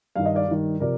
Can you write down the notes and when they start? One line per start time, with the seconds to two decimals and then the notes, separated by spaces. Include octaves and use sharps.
0.16 G2 D#3 F5
0.26 D#5
0.35 D5 F5
0.48 G2 D#3
0.80 C3 F3 A#4 D5